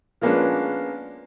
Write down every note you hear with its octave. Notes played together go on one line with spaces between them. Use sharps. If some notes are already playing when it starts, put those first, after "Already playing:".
F3 G#3 A#3 B3 C#4 D4